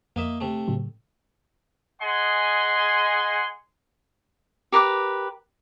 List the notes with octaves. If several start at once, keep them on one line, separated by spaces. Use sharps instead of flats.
F2 A#3 D#5 E5
C3 A3
A2 C#3 F#3
G#4 D#5 F#5 G#5 C6
G4 A#4 B4 D6